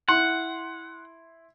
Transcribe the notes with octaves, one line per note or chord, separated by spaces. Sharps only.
E4 F#5 C6